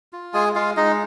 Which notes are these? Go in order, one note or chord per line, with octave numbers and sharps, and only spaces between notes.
F4
G#3 G#4 G#5
G#3 F4 F5
G#3 D#4 D#5